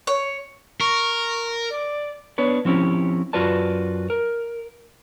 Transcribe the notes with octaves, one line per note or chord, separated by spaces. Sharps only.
C#5
A#4 C#6
D5
B3 D4 B4 C#5
F3 C4 C#4 E4 G4
F#2 F4 F#4 B4 D5 A5
A#4